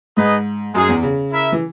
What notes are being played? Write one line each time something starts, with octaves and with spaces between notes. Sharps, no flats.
G#2 D#4 G#4 B4 D#5
F#2 G#3 D#4 G#4
E2
C#3
E4 A#4 E5
E3